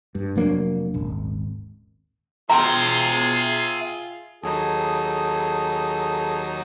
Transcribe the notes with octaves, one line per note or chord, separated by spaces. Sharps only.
G2
F1 F#3 A#3 D4
D#1 G#1
F4 G#4 E5 G5 A#5 C6
D#2 F#3 D#4 G#4 A4